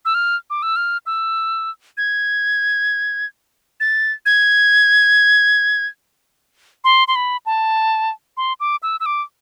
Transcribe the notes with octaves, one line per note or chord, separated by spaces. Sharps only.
E6
F6
D6
E6
F6
E6
G#6
A6
G#6
C6
C6
B5
A5
C6
D6
E6
E6
D6